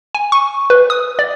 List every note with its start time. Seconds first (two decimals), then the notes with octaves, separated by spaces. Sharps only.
0.15 G#5
0.32 C#6
0.70 B4
0.90 D#6
1.19 D5